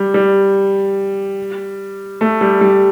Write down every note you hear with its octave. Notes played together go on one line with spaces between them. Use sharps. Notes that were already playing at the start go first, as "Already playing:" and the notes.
Already playing: G3
G3
A3
G3
G3